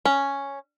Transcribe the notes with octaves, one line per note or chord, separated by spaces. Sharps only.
C#4